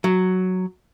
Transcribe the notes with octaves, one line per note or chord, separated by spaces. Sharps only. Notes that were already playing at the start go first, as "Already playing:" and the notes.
F#3